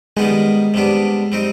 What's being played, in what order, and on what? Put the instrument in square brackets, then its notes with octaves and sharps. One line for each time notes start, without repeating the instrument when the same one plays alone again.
[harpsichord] D#3 G3 B3 D#4 [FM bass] G#3
[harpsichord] C3 G3 B3 D4
G3 C4 D#4